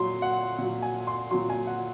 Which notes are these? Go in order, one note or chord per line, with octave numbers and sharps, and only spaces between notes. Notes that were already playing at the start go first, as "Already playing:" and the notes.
Already playing: A#2 F#3 C6
F#5
A#2 F#3
G#5
C6
A#2 F#3 C6
G#5
F#5